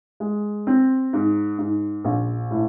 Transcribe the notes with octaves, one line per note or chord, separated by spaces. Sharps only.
G#3
C4
G#2
G#2
A#1
A2